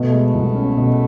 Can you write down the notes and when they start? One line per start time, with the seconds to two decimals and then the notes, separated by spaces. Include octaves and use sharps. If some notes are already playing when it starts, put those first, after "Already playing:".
Already playing: B2 A3 B3
0.12 G#3
0.34 C2
0.55 C#4
0.77 B2